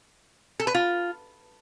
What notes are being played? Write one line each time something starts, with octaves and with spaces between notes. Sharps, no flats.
A4
B4
F4